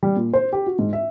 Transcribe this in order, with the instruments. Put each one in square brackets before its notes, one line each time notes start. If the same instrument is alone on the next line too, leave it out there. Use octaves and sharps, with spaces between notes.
[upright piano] G3
A#2
C5
G4
F#4
G#2
E5